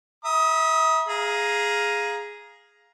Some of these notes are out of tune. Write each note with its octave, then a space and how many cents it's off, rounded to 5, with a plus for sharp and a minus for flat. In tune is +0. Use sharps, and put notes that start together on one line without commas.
E5 -25 A#5 +45 D#6 +15
G#4 +0 F5 +5 A#5 +10